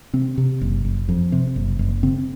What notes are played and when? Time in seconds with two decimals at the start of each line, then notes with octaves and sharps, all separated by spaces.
0.13 C3 C4
0.38 C3
0.61 F#1
0.85 F#1
1.09 F2
1.32 C3
1.56 F#1
1.79 F#1
2.03 C#3 C4